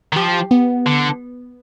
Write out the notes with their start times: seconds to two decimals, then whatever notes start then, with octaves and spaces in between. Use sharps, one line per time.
0.13 D#3
0.16 F3 G4
0.51 B3
0.86 D3